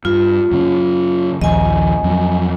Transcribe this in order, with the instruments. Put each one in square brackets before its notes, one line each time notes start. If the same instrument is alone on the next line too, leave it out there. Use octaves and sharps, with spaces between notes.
[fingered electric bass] G2 [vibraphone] F4
[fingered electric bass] F#2 C#3
[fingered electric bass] A#1 D#2 F3 [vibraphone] D#5 G#5
[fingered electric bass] F2 F#3